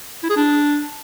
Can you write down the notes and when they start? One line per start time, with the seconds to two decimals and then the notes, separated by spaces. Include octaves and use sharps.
0.23 E4
0.30 G#4
0.36 D4